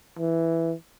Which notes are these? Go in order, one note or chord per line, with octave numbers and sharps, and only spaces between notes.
E3